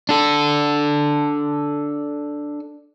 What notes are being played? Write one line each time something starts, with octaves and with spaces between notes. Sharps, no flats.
D4 A4